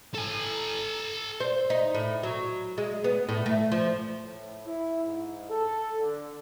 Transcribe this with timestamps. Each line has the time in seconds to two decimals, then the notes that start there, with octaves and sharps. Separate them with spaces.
0.14 A4 G#5
1.40 C5
1.70 D#4
1.95 A2
2.23 F#3
2.78 G#3
3.04 B3
3.29 A2
3.46 A3
3.72 F3
4.21 A2
4.65 E4
5.04 G#2
5.49 A4
5.99 D3